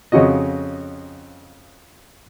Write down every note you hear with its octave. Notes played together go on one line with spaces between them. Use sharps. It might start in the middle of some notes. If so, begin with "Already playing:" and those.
F2 C#3 C#4 F#4 D#5